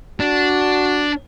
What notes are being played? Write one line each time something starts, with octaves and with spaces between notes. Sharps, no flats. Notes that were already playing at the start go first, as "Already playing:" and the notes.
D4 F#4